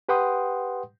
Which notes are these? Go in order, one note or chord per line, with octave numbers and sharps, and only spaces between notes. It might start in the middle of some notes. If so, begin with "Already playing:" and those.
G4 B4 F#5 G5 C6 D#6